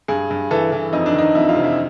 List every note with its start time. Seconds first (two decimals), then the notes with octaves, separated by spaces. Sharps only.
0.08 G2 G#4
0.30 G2
0.51 E3 A4
0.72 E3
0.93 F2 D#4
1.06 D4
1.13 D#3 D#4
1.35 F2 E4
1.49 F4
1.56 C3
1.63 E4